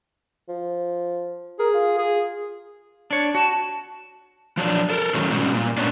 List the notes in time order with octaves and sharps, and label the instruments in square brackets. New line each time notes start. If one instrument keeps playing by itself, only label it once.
[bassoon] F3
[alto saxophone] G#4 [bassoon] A#4
[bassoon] F4
[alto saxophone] G#4
[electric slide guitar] D4 C#5
[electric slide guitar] F#4 [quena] A5
[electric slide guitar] F3 F#3 D4
A4 A#4
D#3 F#3 G#3 A3 C#4
G#2 B2 G3 C#4 F#4
A#2
G#3 A#3 B3 C#4 D4